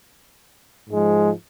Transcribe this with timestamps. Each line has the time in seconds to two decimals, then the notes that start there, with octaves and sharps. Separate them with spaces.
0.89 G#2 F3 G#3